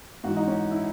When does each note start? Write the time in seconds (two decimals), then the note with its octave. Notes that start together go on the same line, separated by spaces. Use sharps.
0.24 G#2 E3 F#4
0.37 D#4
0.47 C#4
0.71 E4